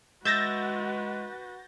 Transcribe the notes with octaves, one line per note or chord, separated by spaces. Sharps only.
G#3 F#4 B4 E5 G6 A6 A#6